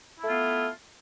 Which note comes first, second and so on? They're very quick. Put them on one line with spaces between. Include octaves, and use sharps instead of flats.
E4 A3 F4 B3